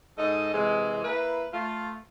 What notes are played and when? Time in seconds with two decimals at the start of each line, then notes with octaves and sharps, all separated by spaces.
0.18 G#2 A4 D#5
0.54 C3 E3 G#3
1.05 A#3 E4 B4
1.53 A3 F4